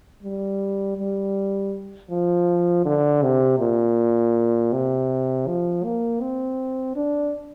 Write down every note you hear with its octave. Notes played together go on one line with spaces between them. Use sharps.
G3
G3
F3
D3
C3
A#2
C3
F3
A#3
C4
D4